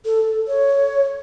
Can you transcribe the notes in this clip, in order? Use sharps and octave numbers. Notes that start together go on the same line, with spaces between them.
A4
C#5